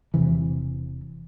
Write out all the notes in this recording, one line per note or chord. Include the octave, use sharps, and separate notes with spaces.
E1 C3 E3